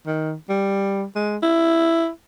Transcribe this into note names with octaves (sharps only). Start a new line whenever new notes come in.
D#3
G3
G#3
E4